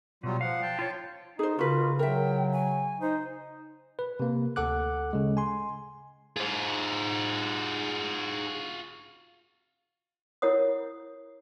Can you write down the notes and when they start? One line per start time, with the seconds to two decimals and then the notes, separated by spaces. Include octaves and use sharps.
0.23 B2 F#3 G3 F4
0.41 F3 F5 F#5
0.62 G5 A5
0.79 F4 C#5
1.39 D#4 G#4 C5
1.59 C#3 F4 F#4 A#4 B4
1.99 F#3 A#4 E5 G5
2.52 G#5
3.01 D#4 C5
3.99 B4
4.20 C3 A#3
4.56 D2 A4 F#5 D6 F#6
5.13 C#3 G#3
5.37 G#5 C6
6.37 F4 F#4 G#4 C5
10.42 E4 A#4 C#5 F#5 D#6